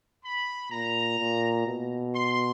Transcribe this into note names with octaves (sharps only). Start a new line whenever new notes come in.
B5
A#2 A#5
A#2
B2
C6